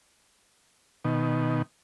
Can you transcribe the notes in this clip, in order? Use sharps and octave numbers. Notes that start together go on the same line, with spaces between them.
B2 D#3